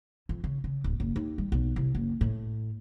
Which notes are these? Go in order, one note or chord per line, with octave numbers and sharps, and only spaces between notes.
F2
C#3
C#3
D1
F#1
D#2
G3
B1
C2
F#1
A2